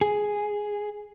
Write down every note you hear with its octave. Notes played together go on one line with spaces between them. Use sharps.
G#4